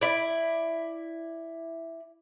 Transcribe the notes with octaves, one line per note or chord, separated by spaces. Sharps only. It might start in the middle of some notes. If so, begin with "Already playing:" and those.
E4 D5